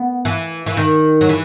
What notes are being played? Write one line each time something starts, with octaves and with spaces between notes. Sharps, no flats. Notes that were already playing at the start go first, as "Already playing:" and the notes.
Already playing: B3
E3
E3
D#3
F#3
E3